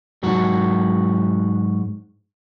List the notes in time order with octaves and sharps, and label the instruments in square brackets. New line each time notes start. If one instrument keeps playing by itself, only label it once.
[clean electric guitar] G#2 F#3 F#4